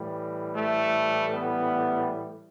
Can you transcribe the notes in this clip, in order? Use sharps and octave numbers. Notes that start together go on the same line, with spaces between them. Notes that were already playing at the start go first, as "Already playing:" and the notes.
Already playing: A2 E3 G3
A3
B3